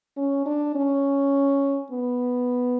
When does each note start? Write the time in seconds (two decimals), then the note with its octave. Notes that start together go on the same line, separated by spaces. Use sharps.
0.17 C#4
0.46 D4
0.75 C#4
1.91 B3